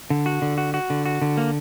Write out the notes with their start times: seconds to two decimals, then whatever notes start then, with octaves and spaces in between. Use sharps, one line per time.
0.10 D3
0.26 F#4
0.42 D3
0.58 F#4
0.74 F#4
0.90 D3
1.06 F#4
1.22 D3
1.37 A#3